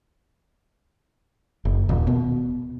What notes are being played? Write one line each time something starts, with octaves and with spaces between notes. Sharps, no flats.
F#1
D#1
B2